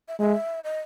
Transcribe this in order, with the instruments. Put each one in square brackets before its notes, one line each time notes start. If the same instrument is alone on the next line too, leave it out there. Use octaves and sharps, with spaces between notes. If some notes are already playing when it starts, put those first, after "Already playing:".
[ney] E5
[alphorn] G#3 [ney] E5
[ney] D#5